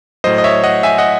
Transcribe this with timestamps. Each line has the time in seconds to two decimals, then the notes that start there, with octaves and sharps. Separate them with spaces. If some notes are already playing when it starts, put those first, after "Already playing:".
0.24 A2 F#3 C5 D#5
0.38 D#5
0.44 C#5 E5
0.64 D#5 F#5
0.83 E5 G#5
0.98 D#5 F#5